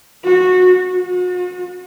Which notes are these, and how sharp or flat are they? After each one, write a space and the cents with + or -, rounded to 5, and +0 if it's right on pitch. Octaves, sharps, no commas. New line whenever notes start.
F#4 -15
F#4 -40